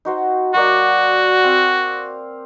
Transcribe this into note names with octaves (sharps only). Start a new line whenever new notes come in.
D#4 F#4 C5
F#3 A#3 F#4 D5
C4 F5